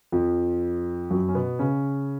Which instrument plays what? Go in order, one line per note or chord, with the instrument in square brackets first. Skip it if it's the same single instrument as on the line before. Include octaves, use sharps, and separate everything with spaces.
[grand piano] F2 F3
F#2 F#3
C#4
B2 B3
C#3 C#4